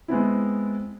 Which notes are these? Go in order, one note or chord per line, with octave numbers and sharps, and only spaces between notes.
G#3 B3 C4 E4